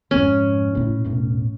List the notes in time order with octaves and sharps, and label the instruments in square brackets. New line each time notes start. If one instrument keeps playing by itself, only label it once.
[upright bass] F2 G#2 [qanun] C#4
[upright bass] A2 E4
E1 A2